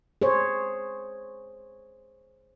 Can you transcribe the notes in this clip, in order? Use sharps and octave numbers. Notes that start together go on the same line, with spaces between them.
G#4 C5 C#5